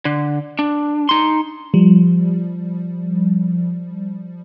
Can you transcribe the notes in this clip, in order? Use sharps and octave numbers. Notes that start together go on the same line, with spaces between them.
D3
D4
D#4 C6
F3 G3